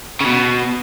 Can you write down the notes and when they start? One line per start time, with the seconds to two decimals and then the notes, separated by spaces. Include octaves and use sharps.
0.21 C#3
0.26 B2